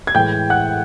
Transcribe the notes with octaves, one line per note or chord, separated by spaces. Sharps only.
G#6
A2 E3 G#3 G5 G6
F#5 F#6